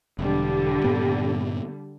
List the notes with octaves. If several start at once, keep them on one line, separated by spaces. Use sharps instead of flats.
E1 D3 G3
G2 A#2 B3